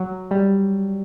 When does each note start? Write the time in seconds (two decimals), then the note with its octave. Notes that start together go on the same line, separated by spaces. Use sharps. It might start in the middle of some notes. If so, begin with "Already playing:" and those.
Already playing: F#3
0.31 G3